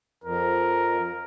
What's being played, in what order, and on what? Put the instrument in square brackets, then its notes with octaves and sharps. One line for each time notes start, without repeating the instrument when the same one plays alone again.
[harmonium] F2 [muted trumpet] A#4